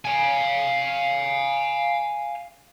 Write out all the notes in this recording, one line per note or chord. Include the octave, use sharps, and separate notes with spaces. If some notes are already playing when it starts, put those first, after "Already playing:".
F5 G#5